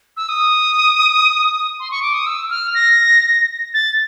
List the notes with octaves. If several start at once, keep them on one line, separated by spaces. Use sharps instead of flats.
E6
D#6
C6
C#6
D6
D#6
E6
F6
A#6
A6